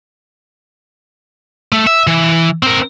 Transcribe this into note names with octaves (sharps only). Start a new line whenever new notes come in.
A3
E5
E3
C4 A#4